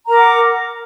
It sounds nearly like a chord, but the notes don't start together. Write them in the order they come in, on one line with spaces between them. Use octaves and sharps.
A#5 A#4 D6 F#5